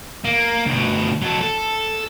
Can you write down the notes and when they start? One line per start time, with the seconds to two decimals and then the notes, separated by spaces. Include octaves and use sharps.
0.25 A#3
0.66 D2 B2
1.22 F#3 A4
1.41 A4